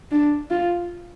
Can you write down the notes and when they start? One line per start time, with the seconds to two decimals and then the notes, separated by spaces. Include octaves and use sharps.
0.11 D4
0.51 F4